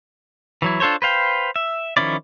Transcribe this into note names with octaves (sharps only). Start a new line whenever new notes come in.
E3 F#3 E4
D4 F4 A4 C5 C#5
B4 C5 F5 G5
E5
D#3 F3 C#4 E4 D5